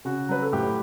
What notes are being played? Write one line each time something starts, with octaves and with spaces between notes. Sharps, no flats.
C#3 F#4
F#3 B4
A4
A2 G4